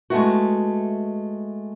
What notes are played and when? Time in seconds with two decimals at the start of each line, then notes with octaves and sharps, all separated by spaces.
0.10 G#3 A3 B3 E4 F#4